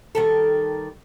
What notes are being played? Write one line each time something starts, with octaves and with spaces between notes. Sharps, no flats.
D#3 G3 A4